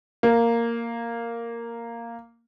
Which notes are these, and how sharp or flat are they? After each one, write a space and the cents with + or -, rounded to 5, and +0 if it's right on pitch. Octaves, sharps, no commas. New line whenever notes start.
A#3 -5